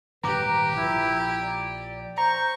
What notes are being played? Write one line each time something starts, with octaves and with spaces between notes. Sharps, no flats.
D#1 G#1 D3 G4 B4 A#5 D6
A#1 F3 E4
D5
C5 A#5 C#6